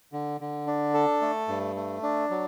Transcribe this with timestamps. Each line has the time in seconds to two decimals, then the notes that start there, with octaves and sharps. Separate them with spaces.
0.13 D3
0.41 D3
0.67 D4
0.94 A4
1.22 A3
1.48 G2
1.76 A3
2.03 D4
2.30 F#3